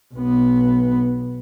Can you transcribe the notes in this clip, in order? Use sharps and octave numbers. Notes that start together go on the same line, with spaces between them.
B1 B3